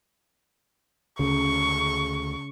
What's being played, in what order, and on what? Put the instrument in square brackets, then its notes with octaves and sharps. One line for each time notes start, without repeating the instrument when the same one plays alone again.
[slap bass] D2 [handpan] C#3 [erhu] C#6